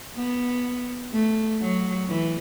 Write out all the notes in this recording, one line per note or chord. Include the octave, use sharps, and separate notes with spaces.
B3
A3
F#3
E3